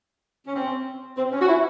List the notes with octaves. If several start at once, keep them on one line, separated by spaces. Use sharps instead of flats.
C#4
C4
C4
C#4
F#4
E4